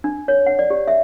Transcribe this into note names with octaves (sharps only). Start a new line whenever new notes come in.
D4
C#5
F#5
D5
G4
E5